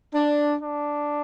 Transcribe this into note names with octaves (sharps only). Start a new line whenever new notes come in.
D4
D4